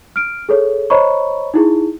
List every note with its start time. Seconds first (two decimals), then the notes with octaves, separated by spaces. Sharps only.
0.16 F6 D7
0.49 G#4 A4 C#5
0.90 C5 C#5 D#5 A#5 B5 C#6
1.54 D#4 E4 G#4